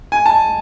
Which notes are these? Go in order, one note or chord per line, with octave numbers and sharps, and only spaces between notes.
G#5
A5